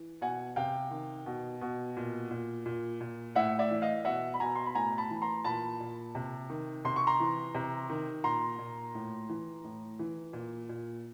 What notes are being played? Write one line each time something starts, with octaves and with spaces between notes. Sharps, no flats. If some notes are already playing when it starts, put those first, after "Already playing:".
Already playing: E3
B2 F#5 G#5
C3 F5 G5
D#3
B2
B2
A#2
A#2
A#2
A#2
A2 E5 F#5
D5 E5
E3
D#5 F5
B2 E5 F#5
B5
B2 G#5 A#5
C6
B5
A2 G#5 A#5
A5 B5
E3
A#5 C6
A#2 A5 B5
A#2
C3
D#3
C3 C6
C#6
A#5 C6
E3
C3
D#3
A#2 A#5 C6
A#2
A2
E3
A2
E3
A#2
A#2